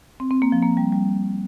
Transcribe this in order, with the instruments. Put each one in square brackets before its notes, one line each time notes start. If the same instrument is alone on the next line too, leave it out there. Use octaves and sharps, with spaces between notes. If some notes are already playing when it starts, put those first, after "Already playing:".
[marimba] C4
C4
A#3
F3
A#3
G3
G3